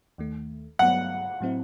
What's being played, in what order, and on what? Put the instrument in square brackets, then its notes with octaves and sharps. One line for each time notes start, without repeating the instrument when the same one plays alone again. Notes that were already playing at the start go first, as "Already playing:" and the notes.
[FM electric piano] D#2 D#3 A3
[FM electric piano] G2 F#3 B3 [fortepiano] F#5
[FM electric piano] A2 F#3 C4 E4